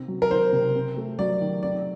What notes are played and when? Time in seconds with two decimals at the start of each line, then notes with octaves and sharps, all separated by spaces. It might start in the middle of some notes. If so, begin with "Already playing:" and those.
Already playing: C3 D#3 C4
0.08 F#3
0.22 A#4
0.31 D#3 C5
0.52 C3
0.75 C4
0.97 A3
1.19 F#3 D5
1.41 D#3
1.63 C4 D5